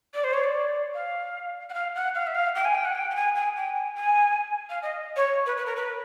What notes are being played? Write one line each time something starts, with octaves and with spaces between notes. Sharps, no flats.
D5
C5
C#5
D5
F5
F#5
F5
F#5
F5
E5
F5
G5
G#5
G5
F#5
G5
G5
G#5
G#5
G5
G#5
G#5
F5
D#5
C#5
B4
B4
A#4
B4